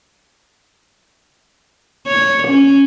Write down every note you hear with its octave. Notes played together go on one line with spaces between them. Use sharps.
C#5
C#4